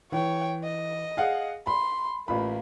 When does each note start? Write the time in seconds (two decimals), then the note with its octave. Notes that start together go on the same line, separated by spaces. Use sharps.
0.12 E3 C#5 G5
0.64 D#5
1.17 G#4 F5 F#5
1.67 B5 C6
2.28 A1 A#3 F4 B5